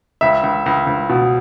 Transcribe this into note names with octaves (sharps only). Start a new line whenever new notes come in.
C#2 E5
C#2
C#2
C#2
B2